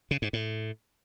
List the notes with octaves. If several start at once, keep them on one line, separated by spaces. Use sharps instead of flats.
C#3
G#2
A2